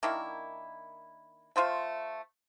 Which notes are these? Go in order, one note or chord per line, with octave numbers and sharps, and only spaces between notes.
D#3 A#3 D4 E4
A3 F4 C5 E5